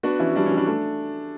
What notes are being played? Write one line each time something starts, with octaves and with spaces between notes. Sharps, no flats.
B3 D4 F#4
E3 C#4 E4
G3 D4
C#4
E3
D4
A3